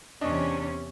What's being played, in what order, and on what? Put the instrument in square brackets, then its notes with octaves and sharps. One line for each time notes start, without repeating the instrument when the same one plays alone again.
[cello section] E2 C3 C#4 [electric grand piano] D4 D#5